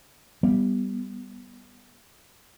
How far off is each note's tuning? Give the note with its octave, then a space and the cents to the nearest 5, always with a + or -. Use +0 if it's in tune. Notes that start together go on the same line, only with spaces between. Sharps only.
G3 +0 B3 +0